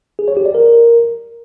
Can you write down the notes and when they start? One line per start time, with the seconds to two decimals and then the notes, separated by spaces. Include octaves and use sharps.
0.19 G#4
0.28 C#5
0.37 G4
0.46 D5
0.55 A#4